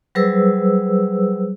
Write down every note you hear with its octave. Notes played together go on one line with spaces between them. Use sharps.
F#3 G3 G#4 B4 C5 E6